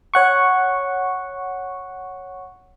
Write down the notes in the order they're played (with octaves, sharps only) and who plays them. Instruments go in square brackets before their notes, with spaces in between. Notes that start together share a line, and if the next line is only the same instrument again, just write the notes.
[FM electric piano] C#5 F#5 C#6